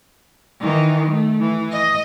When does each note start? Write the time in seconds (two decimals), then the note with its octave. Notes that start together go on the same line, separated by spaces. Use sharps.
0.60 D#3 E3
1.11 A3
1.40 E3
1.72 D#5